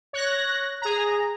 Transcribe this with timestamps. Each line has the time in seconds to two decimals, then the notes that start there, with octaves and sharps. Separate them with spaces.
0.13 C#5 F#6 A#6
0.82 G#4 A#5